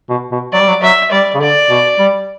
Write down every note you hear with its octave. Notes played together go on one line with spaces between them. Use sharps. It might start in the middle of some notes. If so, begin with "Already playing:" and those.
B2
B2
F#3 D5
G3
F#3
F#3 E5
G3 D5
C#3
D3 D5
B2
G3